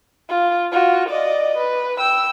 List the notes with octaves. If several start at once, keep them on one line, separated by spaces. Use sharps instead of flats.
F4
F4 F#4
D5 D#5
B4
G5 E6